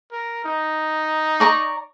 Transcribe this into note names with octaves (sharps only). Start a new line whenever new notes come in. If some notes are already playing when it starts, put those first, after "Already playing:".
A#4
D#4
D5 A#5 C#6